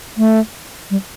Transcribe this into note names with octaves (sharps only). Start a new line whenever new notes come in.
A3
G3